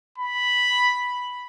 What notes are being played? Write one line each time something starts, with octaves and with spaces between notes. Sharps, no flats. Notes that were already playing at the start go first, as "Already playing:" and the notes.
B5